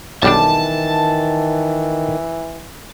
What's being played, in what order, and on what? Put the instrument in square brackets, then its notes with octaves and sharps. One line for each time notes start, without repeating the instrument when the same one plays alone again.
[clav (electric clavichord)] B1 G3 D4 [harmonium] D#3 [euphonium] E3 [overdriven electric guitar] A5